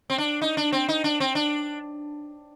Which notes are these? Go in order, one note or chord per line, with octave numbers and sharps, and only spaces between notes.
C4
D4
D#4
D4
C4
D#4
D4
C4
D4